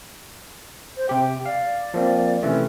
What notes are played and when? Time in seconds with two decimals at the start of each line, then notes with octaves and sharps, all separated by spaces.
0.97 C5
1.09 C3 G4 G5
1.46 D5 F5
1.94 F3 A#3 C4
2.43 C3 E3 A3 C#4